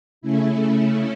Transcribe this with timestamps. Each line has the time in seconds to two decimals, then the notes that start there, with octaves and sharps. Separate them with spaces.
0.21 C#3 A3 C#4 E4